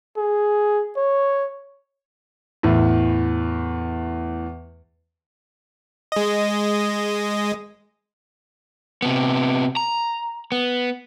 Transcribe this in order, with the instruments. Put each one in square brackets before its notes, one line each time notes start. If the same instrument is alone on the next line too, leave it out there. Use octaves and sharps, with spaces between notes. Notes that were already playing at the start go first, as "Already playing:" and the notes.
[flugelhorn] G#4
C#5
[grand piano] E2 A2
[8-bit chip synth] G#3 D#5
[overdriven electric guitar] C3 B3
A#5
B3